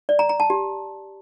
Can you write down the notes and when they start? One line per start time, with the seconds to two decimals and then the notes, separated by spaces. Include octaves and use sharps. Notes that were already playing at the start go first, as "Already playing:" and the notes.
0.09 D5
0.19 A#5
0.29 A#5
0.40 A5
0.50 G4